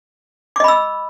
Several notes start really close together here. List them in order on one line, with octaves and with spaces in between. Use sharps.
D6 D#5 B5 E6